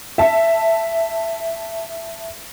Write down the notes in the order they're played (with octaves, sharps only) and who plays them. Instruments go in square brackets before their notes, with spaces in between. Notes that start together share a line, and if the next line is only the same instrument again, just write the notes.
[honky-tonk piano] E5 A5